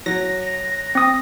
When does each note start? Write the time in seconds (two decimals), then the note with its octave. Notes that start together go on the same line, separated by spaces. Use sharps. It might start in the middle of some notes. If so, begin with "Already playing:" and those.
0.06 F#3 A#6
0.95 C4 D#6